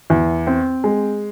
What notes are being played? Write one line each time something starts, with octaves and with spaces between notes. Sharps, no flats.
E2
C4
G#3